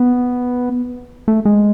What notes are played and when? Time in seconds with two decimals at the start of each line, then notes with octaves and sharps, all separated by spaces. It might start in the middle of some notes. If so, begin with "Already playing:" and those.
Already playing: B3
1.28 A3
1.45 G#3